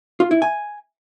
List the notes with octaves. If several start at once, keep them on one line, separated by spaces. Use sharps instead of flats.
F4
E4
G#5